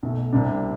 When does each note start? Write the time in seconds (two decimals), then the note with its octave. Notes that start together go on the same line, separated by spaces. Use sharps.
0.03 B1 B2 A3
0.33 C2 C3 G3 D4